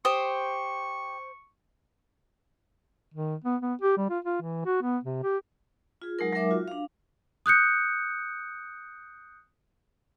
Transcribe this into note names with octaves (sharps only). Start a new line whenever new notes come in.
G4 C5 C#6 D#6
D#3
B3
B3
G4
G3
F4
F4
E3
F#4
B3
C3
G4
F4 G#4
F#3 G#3 D#4 A#4
F#3 G#3 D#4 A#4 E5 D6
F4 F#4
D4 F5
D#6 F#6 G6 C#7